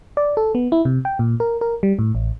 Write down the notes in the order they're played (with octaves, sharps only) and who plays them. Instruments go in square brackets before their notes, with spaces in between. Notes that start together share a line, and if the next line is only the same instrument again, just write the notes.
[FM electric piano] D5
A4
B3
E4
C3
G5
A#2
A#4
A#4
G3
A2
A1